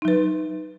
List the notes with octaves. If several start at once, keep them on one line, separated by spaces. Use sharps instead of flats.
F#3 D#4 B4